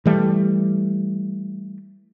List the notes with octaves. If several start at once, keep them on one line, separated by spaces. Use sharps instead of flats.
E3 G3 A3